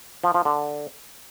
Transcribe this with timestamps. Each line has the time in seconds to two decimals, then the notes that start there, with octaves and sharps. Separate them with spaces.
0.24 F3
0.34 F3
0.45 D3